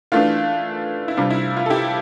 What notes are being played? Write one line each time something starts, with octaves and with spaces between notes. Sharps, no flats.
E3 A3 D4 F4
E4
C3 G3 D4 F4
E4
F4
A4
E4 G4